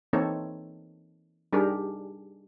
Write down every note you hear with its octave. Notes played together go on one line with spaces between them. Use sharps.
E3 A#3 C4 D#4 A4 C#5
G3 D4 D#4 G4 G#4 A#4